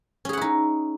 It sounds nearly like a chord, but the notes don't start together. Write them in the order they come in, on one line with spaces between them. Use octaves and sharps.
C#4 G#4 F#5 E4 D#4